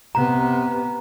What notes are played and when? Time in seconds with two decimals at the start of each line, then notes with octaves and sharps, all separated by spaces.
0.15 C3 B3 A#5